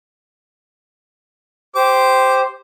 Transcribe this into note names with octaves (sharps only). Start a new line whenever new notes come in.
G4 C5 D6